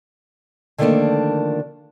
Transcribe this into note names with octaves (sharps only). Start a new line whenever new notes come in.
D3 D#3 F3 A3 A#3 D4